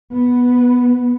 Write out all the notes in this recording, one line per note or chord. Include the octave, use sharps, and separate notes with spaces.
B3